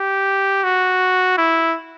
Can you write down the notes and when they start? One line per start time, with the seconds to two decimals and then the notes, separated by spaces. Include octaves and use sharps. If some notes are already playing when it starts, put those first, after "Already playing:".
Already playing: G4
0.64 F#4
1.38 E4